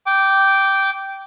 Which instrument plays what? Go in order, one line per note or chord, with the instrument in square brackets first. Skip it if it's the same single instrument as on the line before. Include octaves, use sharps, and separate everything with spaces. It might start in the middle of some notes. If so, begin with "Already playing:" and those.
[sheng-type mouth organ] G5 D6